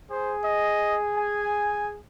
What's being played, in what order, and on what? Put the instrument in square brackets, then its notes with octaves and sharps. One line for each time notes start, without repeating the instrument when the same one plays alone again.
[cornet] G#4 [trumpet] C5
[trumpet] D#5
G#5